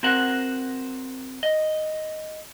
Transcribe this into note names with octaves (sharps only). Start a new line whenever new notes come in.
C4 F#4 A#4 C5 F#5
D#5